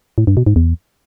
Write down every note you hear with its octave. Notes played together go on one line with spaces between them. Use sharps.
A2
G2
B2
G#2
E2